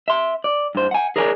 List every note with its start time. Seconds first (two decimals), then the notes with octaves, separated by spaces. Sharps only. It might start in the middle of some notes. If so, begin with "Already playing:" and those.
0.08 E5 C6
0.44 D5
0.75 G2 C5
0.91 F#5 G#5
1.16 G#4 A#4 C#5 D5 F5 G#5